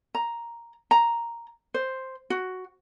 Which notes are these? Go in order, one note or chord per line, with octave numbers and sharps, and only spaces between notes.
A#5
A#5
C5
F#4